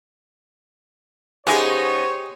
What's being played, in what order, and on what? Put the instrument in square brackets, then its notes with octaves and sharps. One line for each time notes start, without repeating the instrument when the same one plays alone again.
[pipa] C#3 G#3 [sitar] B3 D#4 [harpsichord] G4 G#4 [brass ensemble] C5 C#5